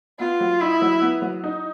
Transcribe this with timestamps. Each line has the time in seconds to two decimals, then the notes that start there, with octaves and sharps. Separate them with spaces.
0.19 B3 F4
0.41 F#3
0.61 D#4 E4
0.82 F#3
1.02 B3
1.22 F#3
1.44 D#4